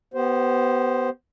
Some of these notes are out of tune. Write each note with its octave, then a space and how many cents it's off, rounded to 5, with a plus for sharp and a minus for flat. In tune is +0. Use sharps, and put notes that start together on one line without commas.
B3 +0 G4 -35 C5 +0